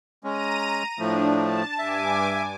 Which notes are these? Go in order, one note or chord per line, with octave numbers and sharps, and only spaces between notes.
G#3 C#4 A#5 D#7
A2 F3 A3 D4
A5
G2 E5 G#5 D6